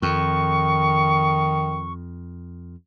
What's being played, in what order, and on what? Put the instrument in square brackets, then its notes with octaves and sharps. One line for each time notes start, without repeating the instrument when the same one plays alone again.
[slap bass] F2 [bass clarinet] D#3 [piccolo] C#6